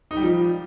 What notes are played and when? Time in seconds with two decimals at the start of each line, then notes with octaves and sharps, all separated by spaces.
0.11 D#4
0.17 G3
0.23 F3